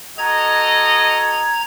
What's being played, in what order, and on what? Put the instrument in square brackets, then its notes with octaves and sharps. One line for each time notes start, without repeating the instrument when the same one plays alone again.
[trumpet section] F#4 A4 D#5 [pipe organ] A#5 G#6